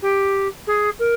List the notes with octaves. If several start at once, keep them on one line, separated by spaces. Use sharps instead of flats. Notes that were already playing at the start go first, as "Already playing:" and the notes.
G4
G#4
A#4